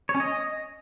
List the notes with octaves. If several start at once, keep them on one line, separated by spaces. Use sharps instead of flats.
C#5
C#4
D#5